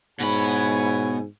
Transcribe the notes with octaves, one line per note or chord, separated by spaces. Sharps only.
G#2 B2 E4 C#5 G#5 B5